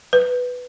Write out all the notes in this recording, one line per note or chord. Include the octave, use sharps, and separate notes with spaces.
B4